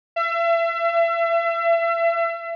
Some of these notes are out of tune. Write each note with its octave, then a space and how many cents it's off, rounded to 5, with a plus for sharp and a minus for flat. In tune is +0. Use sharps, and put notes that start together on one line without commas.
E5 +35